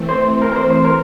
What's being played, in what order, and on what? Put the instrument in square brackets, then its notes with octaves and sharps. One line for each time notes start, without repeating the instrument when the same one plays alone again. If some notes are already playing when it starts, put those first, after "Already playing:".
Already playing: [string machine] E3 A3 C4
[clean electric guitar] C5
A#4
A#4
C5
C5
A#4